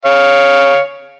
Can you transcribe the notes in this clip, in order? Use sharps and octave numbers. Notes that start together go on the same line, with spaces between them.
C#5 F5